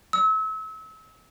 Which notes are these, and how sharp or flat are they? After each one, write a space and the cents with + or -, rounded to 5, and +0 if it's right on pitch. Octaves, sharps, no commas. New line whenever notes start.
E6 -35